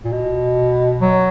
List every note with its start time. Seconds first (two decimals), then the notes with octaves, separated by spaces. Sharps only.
0.04 A#2
0.12 B2
1.02 F#3